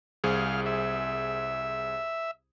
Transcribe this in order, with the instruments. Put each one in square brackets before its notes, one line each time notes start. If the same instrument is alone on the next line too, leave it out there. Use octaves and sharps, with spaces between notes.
[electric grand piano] C2 G#4 C5 [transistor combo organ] F5
[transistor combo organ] E5